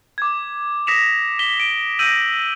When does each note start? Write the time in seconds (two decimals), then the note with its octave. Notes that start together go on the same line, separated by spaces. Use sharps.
0.18 D6 G#6
0.87 D#6 A#6 B6 C#7 E7 F7
1.39 B6 E7 G7
1.60 D7
1.99 E6 G6 A#6 D#7 F#7